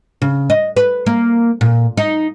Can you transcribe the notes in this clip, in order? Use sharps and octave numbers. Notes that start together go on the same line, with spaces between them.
C#3
D#5
B4
A#3
A#2
D#4